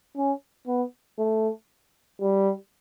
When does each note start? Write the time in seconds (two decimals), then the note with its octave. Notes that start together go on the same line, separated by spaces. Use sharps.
0.17 C#4
0.68 B3
1.19 A3
2.22 G3